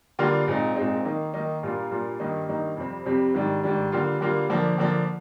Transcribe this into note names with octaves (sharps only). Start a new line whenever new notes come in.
D3 G3 A#3 D4 F4
A#2 G#3 C4 D#4
A#2 G#3 C4 D#4
D#3 A#3 D#4
D#3 A#3 D#4
A#2 G3 A#3 D4 F4
A#2 G3 A#3 D4 F4
G2 D#3 A#3 D#4
G2 D#3 A#3 D#4
F2 C3 G3 C4
F2 C3 G3 C4
G#2 D#3 G3 D4
G#2 D#3 G3 D4
D3 G3 A#3 F4
D3 G3 A#3 F4
D3 F3 A#3 D4
D3 F3 A#3 D4